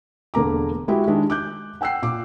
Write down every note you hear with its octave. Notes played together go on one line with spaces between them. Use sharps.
E1 D3 A#3 A#5 D6
G#3 E4 F#4 G4
D#3 G#3 D4
D6 F#6 G6
F#5 G5 E6 F#6 C7
A#2 D6